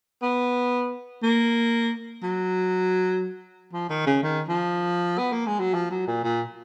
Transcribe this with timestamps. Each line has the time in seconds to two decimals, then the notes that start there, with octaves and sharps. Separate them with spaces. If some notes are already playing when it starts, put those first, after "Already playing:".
0.23 B3
1.23 A#3
2.23 F#3
3.73 F3
3.90 D#3
4.07 C#3
4.23 D#3
4.49 F3
5.18 B3
5.33 A#3
5.47 G#3
5.60 F#3
5.74 F3
5.91 F#3
6.07 A#2
6.24 A#2